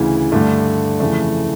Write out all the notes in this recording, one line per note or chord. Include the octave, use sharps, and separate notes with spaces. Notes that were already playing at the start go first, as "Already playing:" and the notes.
Already playing: D2 C#3 E3
G2 D3 A3
F2 C#3 E3 A3